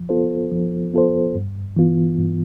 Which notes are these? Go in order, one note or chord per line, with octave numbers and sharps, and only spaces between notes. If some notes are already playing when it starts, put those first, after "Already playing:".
Already playing: F3
B3 F4 A4 C5
F3
B3 F4 A4 C5
G2
E3 B3 F4
G2